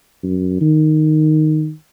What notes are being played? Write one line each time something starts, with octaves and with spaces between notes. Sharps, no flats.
F#2
D#3